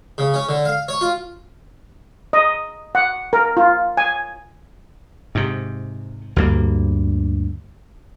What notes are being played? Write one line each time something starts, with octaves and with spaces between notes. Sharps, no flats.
C#3
C#4
D3
F5
C#5
F4
D#5
F#5
A#4
F4
G#5
G#2 C3
D2 G2 A#3